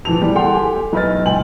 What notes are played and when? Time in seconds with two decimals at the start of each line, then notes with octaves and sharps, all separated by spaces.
0.05 D1 E3 F3 A5 F7
0.22 G3
0.35 A4 F#5 G5 A5 C6
0.55 G4 A4 G#5
0.93 B1 E4 B4 D#5 F6 A6
1.25 C#2 G5 G#5 F#7